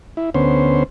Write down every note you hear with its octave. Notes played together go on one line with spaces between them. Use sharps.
E4
D2 B3 C#4 C5